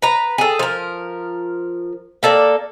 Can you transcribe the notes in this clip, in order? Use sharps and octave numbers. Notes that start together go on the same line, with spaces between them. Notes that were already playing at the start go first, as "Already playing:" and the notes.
B4 A#5
G#4 A4
F3 A#4
A#3 A4 D5